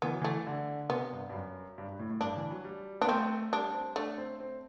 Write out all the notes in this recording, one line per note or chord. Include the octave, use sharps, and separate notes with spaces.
E3 B3
F#3
E3 A3
D3
C3 B3
G2
G2
F#2
G2
G2
A2
A2
G2 D4
E3
F#3
G3
B3 D4
A3 C4
G3 D4
C4
A3 D4
C4
C4